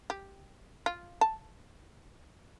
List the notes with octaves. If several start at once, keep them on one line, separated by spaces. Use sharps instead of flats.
G4
F4
A5